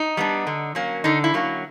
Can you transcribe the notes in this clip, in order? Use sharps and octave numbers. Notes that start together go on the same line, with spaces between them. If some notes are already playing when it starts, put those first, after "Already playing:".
Already playing: D#4
G3 B3 D4
D3
F#3 A#3 C#4
D3 D#4
E4
F#3 A#3 C#4